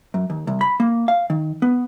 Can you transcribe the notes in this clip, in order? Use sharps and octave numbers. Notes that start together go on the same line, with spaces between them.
F#2
D#2
C2
B5
A#3
F5
D#3
B3